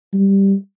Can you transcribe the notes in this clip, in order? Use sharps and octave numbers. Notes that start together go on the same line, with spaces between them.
G3